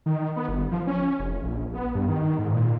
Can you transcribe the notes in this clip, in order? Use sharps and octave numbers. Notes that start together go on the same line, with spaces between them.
D#3
B3
G1
F3
C#4
F1
A#1
B3
G2
D#3
G#2
A#2